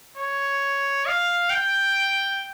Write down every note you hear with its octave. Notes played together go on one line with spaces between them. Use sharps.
C#5
F5
G5